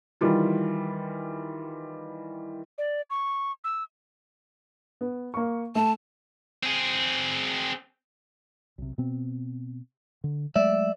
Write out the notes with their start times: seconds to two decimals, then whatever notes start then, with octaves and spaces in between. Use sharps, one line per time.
0.21 D#3 E3 G3 F4
2.78 D5
3.10 C#6
3.64 E6
5.01 B3
5.34 A#3 C#6
5.75 A3 A5
6.63 C4 G#4
8.78 B1 C3
8.98 B2 B3 C4
10.24 D3
10.56 F#3 G#3 A3 D5 E5